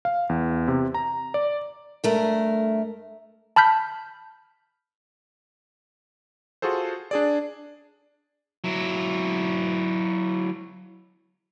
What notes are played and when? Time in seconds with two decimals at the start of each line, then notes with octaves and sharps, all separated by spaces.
0.05 F5
0.29 E2
0.68 C3
0.94 A#5
1.34 D5
2.04 G2 A3 A#4
3.56 A5 B5 F6 G6 B6
6.62 F4 F#4 G#4 A4 C5
7.11 D4 G#4 D5
8.64 F#3 E4